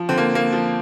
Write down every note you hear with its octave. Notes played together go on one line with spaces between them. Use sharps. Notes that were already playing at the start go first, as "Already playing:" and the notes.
Already playing: F3
D3 C4
A#3
A#3
F3